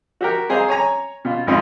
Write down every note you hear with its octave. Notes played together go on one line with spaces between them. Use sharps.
F#4 G4 A#4
C4 G#4 C5 D#5 F5 A#5
C#5 G#5 A#5
B2 F4
G#1 F2 D#4 F4 C6